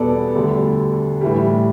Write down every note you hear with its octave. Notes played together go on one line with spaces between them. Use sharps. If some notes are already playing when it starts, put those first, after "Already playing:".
Already playing: E2 B2 G3 B3 A4 D5
D2 D3 G3
A2 E3 G3